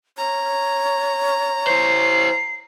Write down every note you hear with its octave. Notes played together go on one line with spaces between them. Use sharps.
C#5 A#5
E4 C5 C7